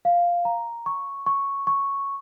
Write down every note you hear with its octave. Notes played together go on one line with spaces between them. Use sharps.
F5
A#5
C#6
C#6
C#6